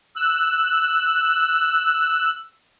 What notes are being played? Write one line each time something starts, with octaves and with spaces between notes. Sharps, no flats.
E6 F#6